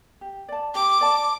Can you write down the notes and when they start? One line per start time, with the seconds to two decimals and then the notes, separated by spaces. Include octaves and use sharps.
0.21 G4
0.49 D5 A5
0.75 G4 D6
1.01 D5 A5